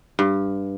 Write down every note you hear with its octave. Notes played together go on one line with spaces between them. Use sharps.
G2